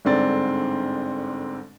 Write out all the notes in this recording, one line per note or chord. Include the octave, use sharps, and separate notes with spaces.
G1 G#2 D3 C4 D5 A6